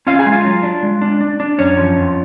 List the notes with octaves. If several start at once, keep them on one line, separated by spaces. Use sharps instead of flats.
C#4 F4 F5
G#4 G#5
G#3
F4 F5
F#3
D4
G#3
D4
D4
D4
F#2 C#4 C#5
F3
F2